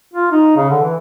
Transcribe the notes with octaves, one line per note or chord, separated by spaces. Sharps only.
F4
D#4
C#3
D3
E3